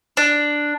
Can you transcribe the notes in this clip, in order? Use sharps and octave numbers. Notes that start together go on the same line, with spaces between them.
D4